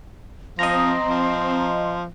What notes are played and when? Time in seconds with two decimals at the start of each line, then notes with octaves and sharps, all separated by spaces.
0.59 F3 C4 D#5 A#5 C6
1.09 F3